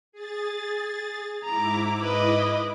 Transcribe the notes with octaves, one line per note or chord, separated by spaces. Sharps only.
G#4 A6
G#2 E4 A#5 D6
B4 D#5